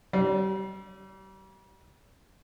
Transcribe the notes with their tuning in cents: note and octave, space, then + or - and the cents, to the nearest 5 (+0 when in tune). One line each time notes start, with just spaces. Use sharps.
G3 -35